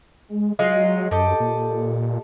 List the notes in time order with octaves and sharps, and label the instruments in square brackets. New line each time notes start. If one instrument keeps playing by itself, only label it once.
[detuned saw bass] G#3
[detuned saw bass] F#3 [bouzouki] G#3 D#4 F4
[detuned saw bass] F#2 [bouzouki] G4 A4 D#5
[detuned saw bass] A#2